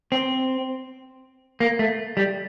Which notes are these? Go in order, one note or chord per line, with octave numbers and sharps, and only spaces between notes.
C4
A#3
A3
G3